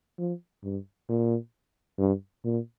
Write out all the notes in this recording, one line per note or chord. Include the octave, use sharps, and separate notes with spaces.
F3
G2
A#2
G2
A#2